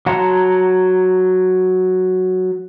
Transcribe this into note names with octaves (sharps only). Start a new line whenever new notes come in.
F#3 F#5 A5 A#5 C6